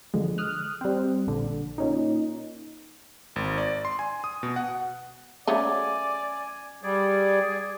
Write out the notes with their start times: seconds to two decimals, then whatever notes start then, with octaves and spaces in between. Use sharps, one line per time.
0.14 D3 F3 G#3
0.38 D#6 F6 F#6
0.81 G3 C4
1.27 A#1 D3
1.78 A#2 C#4 D#4
3.36 G#1
3.58 D5
3.85 C6
3.99 G#5
4.24 D#6
4.43 B2
4.56 F#5
5.47 C#3 F#3 A3 D5 G#5
6.83 G3 G#4 D5